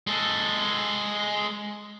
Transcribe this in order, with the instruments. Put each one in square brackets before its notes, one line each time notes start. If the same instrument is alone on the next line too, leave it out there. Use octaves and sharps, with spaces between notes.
[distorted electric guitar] G#3 A4